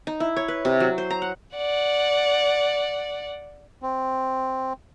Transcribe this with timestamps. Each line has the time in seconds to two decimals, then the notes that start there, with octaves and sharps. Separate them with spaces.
0.07 D#4
0.20 E4
0.36 C#5
0.48 B4
0.65 C3
0.80 F#3
0.98 C5
1.10 A#5
1.22 F#5
1.56 D5 F#5
3.82 C4